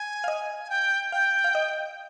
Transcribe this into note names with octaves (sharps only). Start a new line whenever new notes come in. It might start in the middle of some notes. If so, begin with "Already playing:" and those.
Already playing: G#5
F5
D#5
G#5
G5
F5 G5
F5
D#5